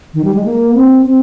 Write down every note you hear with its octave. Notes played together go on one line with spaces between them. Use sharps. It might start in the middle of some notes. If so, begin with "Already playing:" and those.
D#3
G3
G#3
A#3
C4
C4